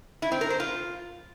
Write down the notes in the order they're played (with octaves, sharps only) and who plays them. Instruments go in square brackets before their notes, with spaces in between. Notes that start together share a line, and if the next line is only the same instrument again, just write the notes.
[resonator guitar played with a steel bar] E4
C4
A#4
C5
F4